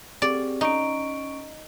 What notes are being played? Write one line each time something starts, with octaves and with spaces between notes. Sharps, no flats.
C4 G4 G#4 D5
C#4 D#4 C#6 D7